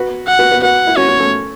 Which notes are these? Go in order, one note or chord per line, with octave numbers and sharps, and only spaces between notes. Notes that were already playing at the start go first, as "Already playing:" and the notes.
Already playing: F#4 B4
F#5
F#4 B4
F#4 B4
F#4 B4 F#5
E4
C#4 F#4 C#5
C#4 F#4
A3 C#4